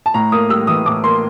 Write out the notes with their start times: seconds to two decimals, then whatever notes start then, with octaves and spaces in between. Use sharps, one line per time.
0.06 A5
0.14 A2 A#5
0.32 A#3 D#6
0.50 G3 E6
0.67 E3 D#6
0.86 A2 D6
1.04 A#3 C6